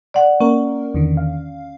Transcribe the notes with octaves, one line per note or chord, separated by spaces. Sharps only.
D5 F#5
A#3 C#4 A#4
E2 D3 D#3
F5